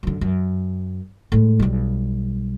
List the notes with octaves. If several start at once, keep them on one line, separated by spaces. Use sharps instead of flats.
F#2 D3
F#2
A2 G#3
B1 G3